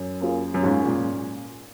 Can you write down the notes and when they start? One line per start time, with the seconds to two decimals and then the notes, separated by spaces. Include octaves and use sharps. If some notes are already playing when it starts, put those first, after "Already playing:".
Already playing: F#2
0.20 A#3 C#4 F4 G#4
0.54 F#2
0.63 G#2 A#3 C#4 F4 G#4
0.85 A#2